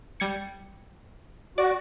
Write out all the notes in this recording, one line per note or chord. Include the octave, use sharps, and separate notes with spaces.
G3 G#6 C#7
F#4 D5